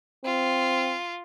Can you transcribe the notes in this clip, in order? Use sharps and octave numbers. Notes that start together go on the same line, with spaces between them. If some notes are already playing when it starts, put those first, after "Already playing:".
C4 F4